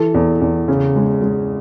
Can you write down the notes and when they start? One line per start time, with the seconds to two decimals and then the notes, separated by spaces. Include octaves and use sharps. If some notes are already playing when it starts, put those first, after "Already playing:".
Already playing: E3 A4
0.14 E2
0.41 E2
0.68 C#3
0.96 G#3
1.22 G#3